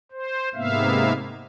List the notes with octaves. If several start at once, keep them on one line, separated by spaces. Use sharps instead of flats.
C5
G#2 C3 A#3 B3 E5 F5